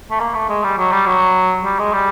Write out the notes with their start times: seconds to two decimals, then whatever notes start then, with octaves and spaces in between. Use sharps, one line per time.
0.11 A3
0.20 A#3
0.35 A3
0.49 G#3
0.64 G3
0.78 F#3
0.92 G3
1.07 F#3
1.65 G3
1.79 G#3
1.93 G3